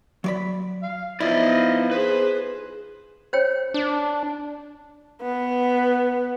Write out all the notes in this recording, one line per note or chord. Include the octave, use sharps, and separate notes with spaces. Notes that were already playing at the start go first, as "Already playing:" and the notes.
F#3 D5 B5
F5
F3 B3 D#4 E4 D5 D#5
G#4 B4 C5
C5 C#5 G5
D4
B3